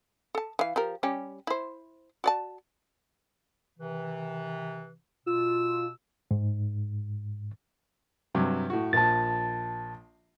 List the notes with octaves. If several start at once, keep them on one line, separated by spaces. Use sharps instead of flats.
A4 A5
E3 F5
F3 G4 A#4
G3 C#4 G4
E4 C5
F#4 D5 A5
C3 D#3 E3
B2 F4 E6
G#2
G2 C3 F#3
A2 F#4
A#1 F3 A5 A6